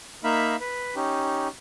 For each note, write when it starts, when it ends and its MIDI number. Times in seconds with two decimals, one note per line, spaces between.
0.24 0.56 58
0.24 0.56 63
0.24 0.56 76
0.24 0.56 77
0.24 0.56 83
0.60 0.95 71
0.95 1.48 61
0.95 1.48 63
0.95 1.48 67